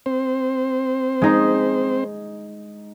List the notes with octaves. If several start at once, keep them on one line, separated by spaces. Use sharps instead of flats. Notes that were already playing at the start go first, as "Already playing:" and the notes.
C4 C5
G#3 D#4